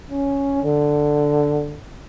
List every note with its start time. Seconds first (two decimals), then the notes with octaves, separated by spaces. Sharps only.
0.11 C#4
0.63 D3